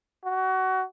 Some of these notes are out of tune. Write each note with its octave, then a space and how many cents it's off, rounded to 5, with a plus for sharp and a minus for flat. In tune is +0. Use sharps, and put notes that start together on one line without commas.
F#4 +25